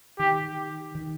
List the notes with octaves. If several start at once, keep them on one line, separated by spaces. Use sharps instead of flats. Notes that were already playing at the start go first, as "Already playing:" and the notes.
D#3 G4
D#3